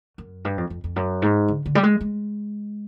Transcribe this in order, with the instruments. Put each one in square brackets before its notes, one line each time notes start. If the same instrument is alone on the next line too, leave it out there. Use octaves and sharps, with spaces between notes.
[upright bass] F#2
G2
F2
F2
F2
F#2
G#2
D3
D3
G3
G#3
G#3